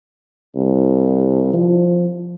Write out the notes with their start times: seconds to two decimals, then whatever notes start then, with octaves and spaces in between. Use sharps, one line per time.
0.56 C2
1.54 F3